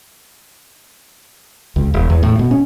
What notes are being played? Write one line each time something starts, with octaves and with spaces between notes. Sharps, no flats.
C#2
E1
E2
A2
B2
C#4